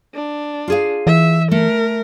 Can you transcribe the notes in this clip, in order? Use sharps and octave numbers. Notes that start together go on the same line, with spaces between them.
D4
F4 G#4 F5
E3 E5
A3 A#4